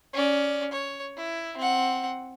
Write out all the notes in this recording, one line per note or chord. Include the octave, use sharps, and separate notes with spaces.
C#4 D5
C#5
E4
C4 F#5